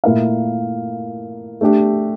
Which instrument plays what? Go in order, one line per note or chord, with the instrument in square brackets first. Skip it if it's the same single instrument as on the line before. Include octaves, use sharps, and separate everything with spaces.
[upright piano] A#2 A3 E4 A#4 F5
A3 D4 G4